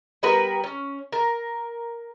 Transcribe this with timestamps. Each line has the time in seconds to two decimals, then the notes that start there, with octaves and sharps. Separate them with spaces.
0.23 G3 B3 A#4 B4
0.64 C#4
1.12 A#4